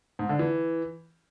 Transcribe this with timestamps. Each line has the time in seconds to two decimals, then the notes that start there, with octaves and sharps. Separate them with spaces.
0.19 G#2
0.29 D3
0.39 E3